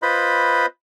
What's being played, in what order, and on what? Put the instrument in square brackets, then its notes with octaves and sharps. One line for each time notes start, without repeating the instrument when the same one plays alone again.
[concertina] F4 B4 C5 D#5 B5